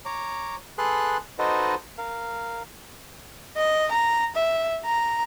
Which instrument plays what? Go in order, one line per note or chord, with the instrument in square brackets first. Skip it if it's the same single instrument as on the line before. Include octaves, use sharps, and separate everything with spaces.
[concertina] C#5 A#5 D6
G#4 A4 B4 C6 F#6
D#4 F#4 A4 B4 C5 D#5
A#4 F5
[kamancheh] D#5
A#5
E5
A#5